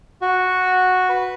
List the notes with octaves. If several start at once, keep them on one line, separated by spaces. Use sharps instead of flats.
F#4
B4